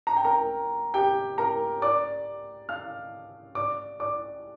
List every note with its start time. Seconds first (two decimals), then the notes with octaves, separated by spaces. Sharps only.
0.07 A#5
0.17 G5
0.25 A#4 A#5
0.94 G4 G5
1.38 A#4 A#5
1.82 D5 D6
2.69 F5 F6
3.55 D5 D6
4.00 D5 D6